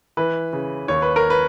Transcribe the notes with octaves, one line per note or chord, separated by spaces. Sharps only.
E3 B4
C#3
D#2 C#5
B4
A#4
B4